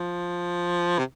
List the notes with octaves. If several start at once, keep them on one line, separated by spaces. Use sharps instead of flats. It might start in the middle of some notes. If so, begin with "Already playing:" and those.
Already playing: F3
C3